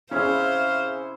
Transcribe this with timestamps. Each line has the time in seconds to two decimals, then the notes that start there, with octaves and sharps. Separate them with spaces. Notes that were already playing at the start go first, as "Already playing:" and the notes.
0.11 C3 C#4 E4 G#4 C5 F5